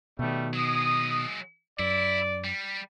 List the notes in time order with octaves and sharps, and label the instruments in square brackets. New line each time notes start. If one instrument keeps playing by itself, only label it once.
[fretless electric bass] B2 D#3 [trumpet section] G3 A3
[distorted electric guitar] F#3 G#3 [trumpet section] D#6
[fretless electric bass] F#2 [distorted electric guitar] E4 [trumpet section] D5
[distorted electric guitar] G3